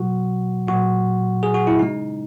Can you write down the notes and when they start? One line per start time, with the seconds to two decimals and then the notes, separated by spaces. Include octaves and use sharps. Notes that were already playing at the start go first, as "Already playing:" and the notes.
Already playing: B2 F#3 F#4
0.68 A#2 F#3 F#4
1.43 G#4
1.54 F#4
1.67 E4
1.79 C#3 G#3 D#4